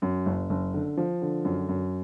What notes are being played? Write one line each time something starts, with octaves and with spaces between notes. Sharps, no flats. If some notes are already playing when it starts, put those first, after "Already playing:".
F#2
F#1
F#1
D3
F3
D3
F#2
F#2